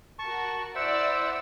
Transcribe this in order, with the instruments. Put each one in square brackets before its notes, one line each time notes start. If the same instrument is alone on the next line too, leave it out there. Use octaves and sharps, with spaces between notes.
[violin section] F#4 A#4 [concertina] A5 C#6
[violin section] E4 D5 E6 [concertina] C5 E5 F#5